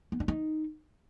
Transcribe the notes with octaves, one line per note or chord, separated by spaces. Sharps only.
B3
D4
D#4